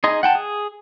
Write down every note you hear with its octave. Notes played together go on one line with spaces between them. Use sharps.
D#4 G#4 D#5 C6
F#5 G5 A5
G#4